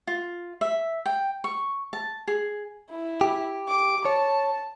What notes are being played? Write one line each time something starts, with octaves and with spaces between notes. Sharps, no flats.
F4
E5
G5
C#6
A5
G#4
E4
G4
D6
C#5 A5